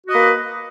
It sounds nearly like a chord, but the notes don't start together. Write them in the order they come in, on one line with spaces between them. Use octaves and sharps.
F#4 D#5 B4 A#3